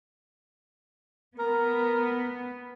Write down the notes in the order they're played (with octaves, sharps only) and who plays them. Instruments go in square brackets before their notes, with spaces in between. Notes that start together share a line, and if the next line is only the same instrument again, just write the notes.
[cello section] B3 [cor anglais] A#4